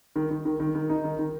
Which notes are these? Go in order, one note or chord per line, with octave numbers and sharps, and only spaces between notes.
D#3
D#3
D#3
D#3
D#3
D#4
D#3
D#3